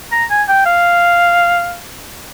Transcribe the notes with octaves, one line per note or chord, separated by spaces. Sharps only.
A#5
G#5
G5
F5